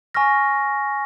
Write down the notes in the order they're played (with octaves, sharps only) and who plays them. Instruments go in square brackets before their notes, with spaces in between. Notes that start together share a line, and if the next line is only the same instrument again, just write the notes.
[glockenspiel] G#5 C#6 F6 A#6